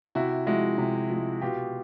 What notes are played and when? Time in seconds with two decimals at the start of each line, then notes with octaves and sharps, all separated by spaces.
0.15 C3 E4 F#4
0.47 F3 G#3 E4 F#4
0.78 C3
1.10 F3 G#3
1.42 B2 F4 G4